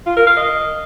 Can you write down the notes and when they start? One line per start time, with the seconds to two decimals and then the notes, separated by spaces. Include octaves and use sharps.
0.06 F4
0.16 A#4
0.27 F5
0.37 D#5